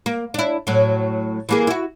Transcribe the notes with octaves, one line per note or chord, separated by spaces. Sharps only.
A#3
D4 E4
A2 F#3
E3 A#3 G#4
E4 F#4